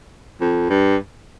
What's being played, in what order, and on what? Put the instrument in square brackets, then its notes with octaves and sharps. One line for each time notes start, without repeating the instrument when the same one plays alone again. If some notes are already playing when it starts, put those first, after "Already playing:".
[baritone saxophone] F2
G2